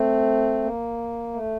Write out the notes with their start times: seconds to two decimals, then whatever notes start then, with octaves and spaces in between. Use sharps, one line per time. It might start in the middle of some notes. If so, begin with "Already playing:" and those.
Already playing: A3 C4
0.63 A#3
1.34 A3